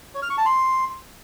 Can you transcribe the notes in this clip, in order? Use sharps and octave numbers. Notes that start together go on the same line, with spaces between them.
C#5
F6
C#6
A5
C6